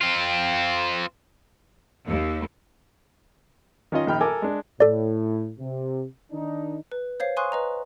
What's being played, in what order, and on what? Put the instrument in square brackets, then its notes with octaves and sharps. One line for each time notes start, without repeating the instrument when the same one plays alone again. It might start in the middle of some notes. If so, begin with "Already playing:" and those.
[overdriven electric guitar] C4 F4
[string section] D#2
[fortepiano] D#3 C#4 F4 D#5
A#1 D#3 G5 B5 F6
A4 A#4 G#5 D6
G#3 D4
[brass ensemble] A2 [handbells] A4 D5
[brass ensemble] C3
D#3 D4 D#4
[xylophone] B4
C5 C#5 F5 C7
F5 G#5 C6 C#6 D#6 F#6
B4 D#5 A#5